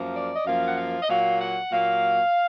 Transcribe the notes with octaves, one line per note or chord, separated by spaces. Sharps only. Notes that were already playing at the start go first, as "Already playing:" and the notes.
Already playing: F#2 F3 A#3
D5
D#5
F#2 F3 A#3 F5
F#5
F5
D#5
A#2 F#3 A#3 F5
F#5
A#2 F#3 A#3 F5